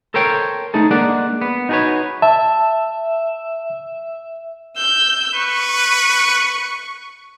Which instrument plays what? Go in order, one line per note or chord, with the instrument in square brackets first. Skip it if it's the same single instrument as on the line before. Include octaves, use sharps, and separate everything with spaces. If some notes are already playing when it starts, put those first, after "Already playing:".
[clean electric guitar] A4 A#4 C5 C#5 G5
A3 D#4 G#4 A4
G#3 A#3 D4 D5 F#5
B3
D#4 F#4 G#4 A4 B4 C#5
[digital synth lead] E5 [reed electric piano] A5
[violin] E6 G6
[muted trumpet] B4 [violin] C#6